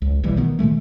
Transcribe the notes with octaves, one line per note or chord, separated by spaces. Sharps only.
C#2
B1 E3 G3
B2 D#3 B3
A#2 D#3 G#3 A3